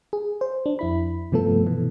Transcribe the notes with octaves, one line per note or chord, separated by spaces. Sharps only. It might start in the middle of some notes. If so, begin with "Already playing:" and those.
G#4
C5
D4
F2 E4 B5
G2 C3 F3 A3 B3 A4
B2 E3